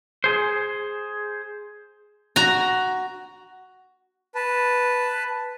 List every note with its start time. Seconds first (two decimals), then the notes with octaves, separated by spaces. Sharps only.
0.24 G#4 C5
2.36 F#4 A#5
4.35 B4 A5